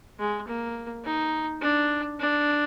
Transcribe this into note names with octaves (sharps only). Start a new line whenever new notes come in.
G#3
A#3
D#4
D4
D4